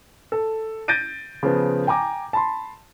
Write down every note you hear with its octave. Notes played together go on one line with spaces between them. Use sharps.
A4
G6 A6 A#6 D7 D#7
C#3 F3 B3
G5 G#5 A#5 D6
A5 B5 C6